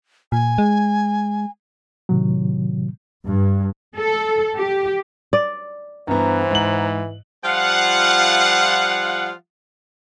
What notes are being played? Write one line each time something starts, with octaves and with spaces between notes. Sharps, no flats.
A#2 G#5
G#3
A2 C3 D#3 F#3
G2
A4
G4
D5
G2 E3 B3 C5 F#5 A#5
G#2 F#7
F3 G3 F4 F5 F#5